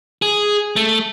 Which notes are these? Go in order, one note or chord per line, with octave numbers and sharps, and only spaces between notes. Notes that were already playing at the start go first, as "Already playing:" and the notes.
G#4
A3